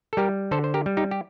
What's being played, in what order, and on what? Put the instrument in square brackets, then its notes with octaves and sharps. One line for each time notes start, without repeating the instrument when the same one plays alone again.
[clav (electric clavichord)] A4
G3 G4 A#4
D3 A4 C5
C5
G4 A#4
G3
D#4 G4
G4